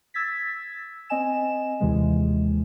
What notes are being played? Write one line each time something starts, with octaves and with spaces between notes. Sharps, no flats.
E6 G#6 A6 B6
C4 D#5 G#5 E7
D#2 C3 E3 G#3